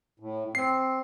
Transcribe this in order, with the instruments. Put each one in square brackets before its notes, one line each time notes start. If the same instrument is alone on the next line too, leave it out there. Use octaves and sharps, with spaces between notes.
[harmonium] A2
[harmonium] C4 [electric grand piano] C7